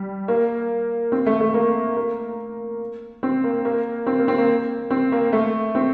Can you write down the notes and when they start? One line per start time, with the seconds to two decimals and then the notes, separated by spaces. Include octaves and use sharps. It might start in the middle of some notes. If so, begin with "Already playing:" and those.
Already playing: G3
0.28 A#3
1.12 C4
1.26 A3
1.40 A3
1.54 A#3
1.96 A#3
3.23 C4
3.44 A#3
3.65 A#3
4.06 C4
4.19 A#3
4.28 C4
4.38 A#3
4.90 C4
5.12 A#3
5.33 A3
5.75 C4